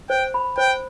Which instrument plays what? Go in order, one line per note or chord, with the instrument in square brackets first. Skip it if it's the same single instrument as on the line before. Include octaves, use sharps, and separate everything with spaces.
[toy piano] C5 [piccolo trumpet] G5
[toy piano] B5
[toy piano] C5 [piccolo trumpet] G5